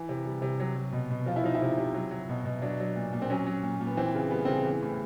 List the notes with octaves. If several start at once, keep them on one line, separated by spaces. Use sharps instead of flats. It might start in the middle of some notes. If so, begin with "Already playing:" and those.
Already playing: E3
C3
G3
C3
F#3
F#3
B2
B2
F3 F4
E4
F3 D#4
E4
C3
C3
F#3
F#3
B2
B2
F#3 D4
F#3
A#2
A#2
C4
F#3 C#4
F#3
A#2
A#2
B3
E3 C4
C#3
G3 B3
C#3 C4
B3
E3
A2